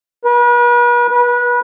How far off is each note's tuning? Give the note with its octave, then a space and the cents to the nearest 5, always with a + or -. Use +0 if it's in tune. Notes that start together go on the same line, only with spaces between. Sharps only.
B4 -40
B4 -25